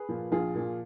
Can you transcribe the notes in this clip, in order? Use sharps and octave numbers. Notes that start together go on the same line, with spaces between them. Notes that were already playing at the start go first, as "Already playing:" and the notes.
Already playing: G#4 B4
A#2 F3
A#1 F4 G#4
A#2 F3